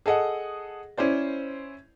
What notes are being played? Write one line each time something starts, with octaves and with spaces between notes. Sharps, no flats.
G#4 A4 D#5 F#5
C#4 E4 C5 D5